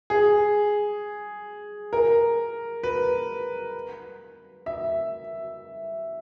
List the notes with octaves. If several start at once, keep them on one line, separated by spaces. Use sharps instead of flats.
G#4
A#4
B4
E5